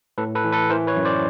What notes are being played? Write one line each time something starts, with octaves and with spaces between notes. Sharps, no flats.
A2 A4 B4
A4 B4
E3
A4 B4
E3 A#4 C5
B4 C#5
F#2
C5 D5